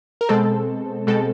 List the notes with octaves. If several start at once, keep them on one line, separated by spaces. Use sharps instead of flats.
A#4
B2 G#3 C4 A4
B2 G#3 C4 A4